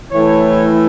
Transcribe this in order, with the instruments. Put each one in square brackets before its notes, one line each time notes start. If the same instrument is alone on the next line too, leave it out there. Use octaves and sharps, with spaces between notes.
[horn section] A2 E3 A3 C#5